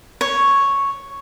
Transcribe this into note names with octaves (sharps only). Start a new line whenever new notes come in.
C#5